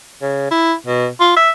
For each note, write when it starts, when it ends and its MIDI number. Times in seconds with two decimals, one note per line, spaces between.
0.22 0.46 49
0.51 0.73 64
0.87 1.07 47
1.20 1.32 65
1.36 1.50 76